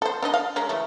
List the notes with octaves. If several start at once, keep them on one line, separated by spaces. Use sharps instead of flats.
A4 C5
D4 D#4 D#5
F5
G#3 C#4 A#4
C#3 E3 A3